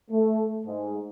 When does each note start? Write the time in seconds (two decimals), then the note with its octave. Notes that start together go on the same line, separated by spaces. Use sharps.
0.11 A3
0.65 G#2